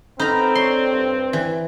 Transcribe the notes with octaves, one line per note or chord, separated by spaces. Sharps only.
B3 C4 D#4 A4 A#5 B5 F6
D4 C#5 C6
G2
E3